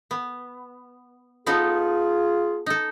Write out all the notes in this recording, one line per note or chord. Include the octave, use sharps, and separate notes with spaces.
B3
B3 D#4 F4 G#4 A4
D#4 A4